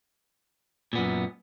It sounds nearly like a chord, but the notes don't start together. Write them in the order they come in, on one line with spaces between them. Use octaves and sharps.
A#2 B3 F#2